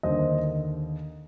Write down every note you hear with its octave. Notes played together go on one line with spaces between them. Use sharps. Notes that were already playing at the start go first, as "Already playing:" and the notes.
D#2 D3 C5 D#5